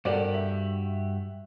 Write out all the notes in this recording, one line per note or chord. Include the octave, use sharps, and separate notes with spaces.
G2 F#4 G4 A4 A#4 D5
E5